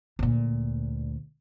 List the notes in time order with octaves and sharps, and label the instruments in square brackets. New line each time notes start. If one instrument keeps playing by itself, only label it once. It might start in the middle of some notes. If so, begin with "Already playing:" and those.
[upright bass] D2 A#2